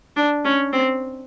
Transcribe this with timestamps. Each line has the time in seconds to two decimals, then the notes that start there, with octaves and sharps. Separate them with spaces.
0.16 D4
0.45 C#4
0.73 C4